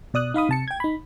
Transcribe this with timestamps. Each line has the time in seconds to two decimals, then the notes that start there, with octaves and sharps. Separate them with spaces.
0.14 B2 D5 D#6 F#6
0.34 D#4 F5 B5 D#6
0.49 C3 A5 C#7
0.68 G5 G#6
0.80 D#4 B5